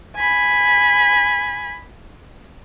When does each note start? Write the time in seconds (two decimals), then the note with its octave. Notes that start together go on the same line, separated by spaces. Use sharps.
0.16 G#5 B5